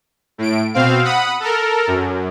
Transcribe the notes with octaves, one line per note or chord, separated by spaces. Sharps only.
A2 D7
B2 C4 F5
F#5 B5 D#6
A4 A#4
F#2